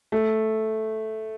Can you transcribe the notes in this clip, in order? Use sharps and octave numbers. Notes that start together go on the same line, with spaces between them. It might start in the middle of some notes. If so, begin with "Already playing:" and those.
A3